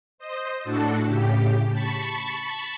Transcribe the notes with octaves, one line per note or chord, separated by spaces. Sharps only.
C5 D#5
A2 D4 F#4 A4
A2 C#3 G4
A5 B5 C#6